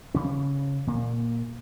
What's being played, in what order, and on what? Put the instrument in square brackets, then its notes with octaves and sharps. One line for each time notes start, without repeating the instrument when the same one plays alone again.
[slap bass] C#3 C#4
A#2 A#3